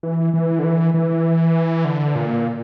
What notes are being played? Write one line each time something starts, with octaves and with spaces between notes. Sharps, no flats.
E3
E3
D3
E3
E3
D3
A#2